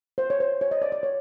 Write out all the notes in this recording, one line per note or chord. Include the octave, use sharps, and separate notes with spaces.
C5
C#5
C5
C#5
D#5
D5
D5
C#5